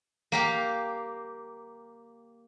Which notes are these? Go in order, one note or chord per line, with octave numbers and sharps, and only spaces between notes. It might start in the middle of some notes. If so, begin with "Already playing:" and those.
A#3 G4 F5